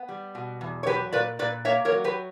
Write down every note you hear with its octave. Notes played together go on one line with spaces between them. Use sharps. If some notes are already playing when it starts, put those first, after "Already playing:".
Already playing: B3
G3
B2
E2
C#5
F#3 G4 B4
A#2 B4 D5
A#2 B4 D5
A#3 C#5 E5
A#4 C#5
F#3
G4 B4